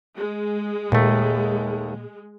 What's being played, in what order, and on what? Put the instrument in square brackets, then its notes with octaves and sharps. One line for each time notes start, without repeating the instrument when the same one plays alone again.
[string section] G#3
[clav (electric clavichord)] D#2 A3 [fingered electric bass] A#2